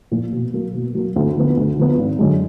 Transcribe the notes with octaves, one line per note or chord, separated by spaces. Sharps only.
A#2 F3
B2
F#3 A#3
B2
F#3 A#3
D2
D3 F3 B3
D2
D3 F3 B3
G#1
F#2 D3 G#3